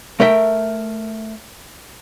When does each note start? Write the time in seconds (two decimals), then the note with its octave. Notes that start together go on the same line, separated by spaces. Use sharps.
0.20 A3 A#4 E5 G5